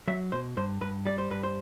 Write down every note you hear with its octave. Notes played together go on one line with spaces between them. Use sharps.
F#3 E5
B2 C5
G2 C5
G2 B4
G3 D5
C5
G2 B4
C5